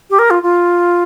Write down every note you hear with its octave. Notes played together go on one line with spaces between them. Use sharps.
G4
A#4
F4
F4